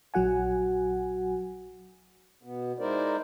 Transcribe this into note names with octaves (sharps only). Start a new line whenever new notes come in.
A#1 F#3 F#4 F#5 G#5
B2 B3
G#3 D#4 E4 A#4 C5 D5